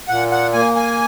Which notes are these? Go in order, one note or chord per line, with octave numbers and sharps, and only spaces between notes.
A#2 F#5
F#5
A#3 G#5
G#5